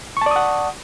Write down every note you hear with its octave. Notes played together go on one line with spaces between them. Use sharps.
D5 F#5 A5 C#6 D#6